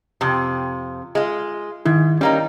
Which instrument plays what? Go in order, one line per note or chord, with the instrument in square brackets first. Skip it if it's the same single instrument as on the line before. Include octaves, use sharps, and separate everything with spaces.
[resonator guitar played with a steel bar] F2 C3
G#3 F4
[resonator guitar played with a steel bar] G#2 [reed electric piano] D#3 E4
[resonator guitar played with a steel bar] G3 A#3 D#4 [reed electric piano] C#4